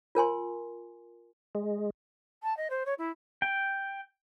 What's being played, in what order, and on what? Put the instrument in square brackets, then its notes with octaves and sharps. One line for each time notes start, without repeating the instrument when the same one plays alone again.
[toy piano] F4 A#4 G#5 C6
[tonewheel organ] G#3
[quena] A5
D#5
C5
C#5
E4
[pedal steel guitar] G5